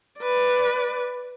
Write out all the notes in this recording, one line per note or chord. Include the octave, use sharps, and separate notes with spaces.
B4 D5